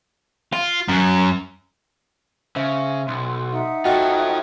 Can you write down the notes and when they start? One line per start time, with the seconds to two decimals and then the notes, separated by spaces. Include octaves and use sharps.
0.53 F4
0.88 F#2
2.56 C#3 C5 E5
3.08 B1 C6
3.50 D#4 E5 F#5
3.85 F4 F#4 A4 D#5 G5